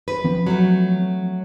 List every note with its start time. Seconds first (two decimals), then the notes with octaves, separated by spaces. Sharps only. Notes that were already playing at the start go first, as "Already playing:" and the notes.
0.08 B4
0.24 F3 C4
0.47 F#3 A3